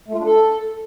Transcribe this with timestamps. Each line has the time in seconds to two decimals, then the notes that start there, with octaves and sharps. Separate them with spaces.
0.08 A3
0.14 F4
0.19 D4
0.25 A4